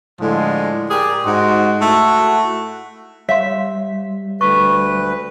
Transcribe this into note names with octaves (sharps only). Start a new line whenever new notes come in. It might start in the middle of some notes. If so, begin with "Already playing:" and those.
A2 D3 F3 G#3
G4 G#4 A#4 D5
G#2 D#4 F#4 C6
A3 E4 F#4
G3 C#5 E5 F5 C6 B6
D2 B4 C#6